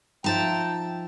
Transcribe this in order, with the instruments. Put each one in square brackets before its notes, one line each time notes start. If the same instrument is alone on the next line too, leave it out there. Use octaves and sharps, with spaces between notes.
[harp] F3 D#4 [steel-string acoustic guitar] E5 A5 A#5 [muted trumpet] G5